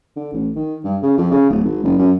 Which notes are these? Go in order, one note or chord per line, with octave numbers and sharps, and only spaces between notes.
D3
A1
D#3
G2
C#3
F2
C#3
D1
G#1
F#1
F#2